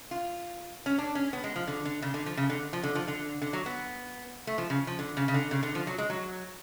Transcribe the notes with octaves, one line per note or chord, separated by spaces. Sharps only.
F4
C#4
D4
C#4
B3
G#3
F3
D3
D3
C#3
D3
F3
C#3
D3
F3
D3
F3
D3
D3
F#3
B3
A3
F3
C#3
F3
D3
C#3
C#3
D3
C#3
D3
F3
F#3
G#3
F#3